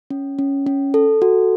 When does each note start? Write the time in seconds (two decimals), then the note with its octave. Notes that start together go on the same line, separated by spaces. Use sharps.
0.11 C#4
0.39 C#4
0.67 C#4
0.94 A4
1.22 F#4